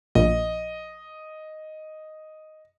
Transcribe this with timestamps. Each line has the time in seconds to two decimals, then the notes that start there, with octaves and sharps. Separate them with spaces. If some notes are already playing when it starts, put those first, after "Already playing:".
0.15 A#1 D#5